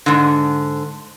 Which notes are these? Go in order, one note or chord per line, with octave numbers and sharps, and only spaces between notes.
G#2 D3